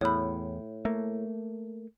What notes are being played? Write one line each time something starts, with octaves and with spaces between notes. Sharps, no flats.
E2 A2 C#5 B5
A3 A#3